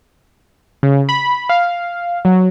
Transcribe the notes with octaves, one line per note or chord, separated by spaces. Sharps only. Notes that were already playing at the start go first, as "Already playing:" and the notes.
C#3
B5
F5
F#3